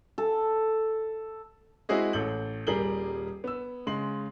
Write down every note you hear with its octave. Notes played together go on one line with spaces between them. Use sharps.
A4
G#3 C4 E4 F#4 G#4 D#5
A1 A4 G6 F#7
D#1 G3 G#4 A#4 F#7 G7
B3 E6
C#3 G#3 C6 F#7